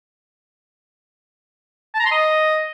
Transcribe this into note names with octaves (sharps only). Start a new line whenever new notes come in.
A5
A#5
C6
D#5